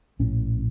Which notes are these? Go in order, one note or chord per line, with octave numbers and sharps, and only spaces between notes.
A#1 A2 C#4